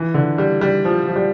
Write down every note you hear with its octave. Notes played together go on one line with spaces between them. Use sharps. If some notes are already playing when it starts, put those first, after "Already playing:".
Already playing: E3
D3
G3
G3
F3
F3
G3